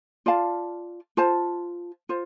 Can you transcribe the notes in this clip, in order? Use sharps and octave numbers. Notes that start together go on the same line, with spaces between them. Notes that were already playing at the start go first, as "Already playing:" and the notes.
F4 D5 F5 A5
F4 C5 A5
F4 C5